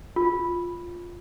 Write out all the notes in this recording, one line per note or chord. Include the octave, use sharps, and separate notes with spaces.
F4